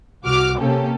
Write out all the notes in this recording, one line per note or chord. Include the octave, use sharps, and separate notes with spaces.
C2 F#4 D6 F6
C3 A#3 C#4 G4 A4